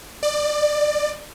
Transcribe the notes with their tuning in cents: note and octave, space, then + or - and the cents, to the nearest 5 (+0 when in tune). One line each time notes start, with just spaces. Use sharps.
D5 +25